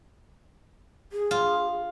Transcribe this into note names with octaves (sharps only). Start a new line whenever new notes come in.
G#4
F4